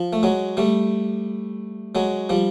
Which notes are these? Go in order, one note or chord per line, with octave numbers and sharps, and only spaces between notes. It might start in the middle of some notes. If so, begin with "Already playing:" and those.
Already playing: F3
A3
F#3 G#3
G3 A3
F#3 G#3
F3 G3